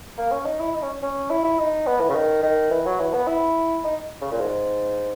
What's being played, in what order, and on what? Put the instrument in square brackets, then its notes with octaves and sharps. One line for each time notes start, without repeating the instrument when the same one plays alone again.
[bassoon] A#3
C#4
D#4
E4
D#4
C#4
C#4
E4
E4
D#4
B3
E3
C#3
D#3
D#3
E3
F#3
E3
B3
E4
D#4
C#3
A#2
G#2